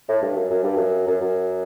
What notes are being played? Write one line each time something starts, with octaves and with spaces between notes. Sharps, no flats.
A2
G2
F#2
F#2
G2
F#2
F#2
F#2